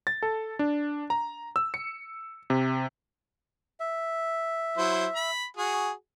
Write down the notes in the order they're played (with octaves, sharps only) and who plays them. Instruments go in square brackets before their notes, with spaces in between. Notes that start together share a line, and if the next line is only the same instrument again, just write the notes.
[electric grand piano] A6
A4
D4
A#5
E6
C#7
C3
[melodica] E5
[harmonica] F#3 E4 C5
B5
[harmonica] F#4 G#4 [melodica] G#5